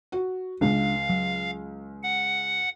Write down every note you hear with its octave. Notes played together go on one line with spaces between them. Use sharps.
F#4
C#2 C#3 G#3 D4 F5
F#3
F#5